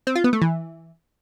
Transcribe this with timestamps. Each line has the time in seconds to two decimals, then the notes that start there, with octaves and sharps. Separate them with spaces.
0.07 C4
0.16 F4
0.24 B3
0.33 A3
0.42 E3